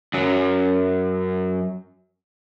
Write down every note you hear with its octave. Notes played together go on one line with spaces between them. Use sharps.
F#2 F#3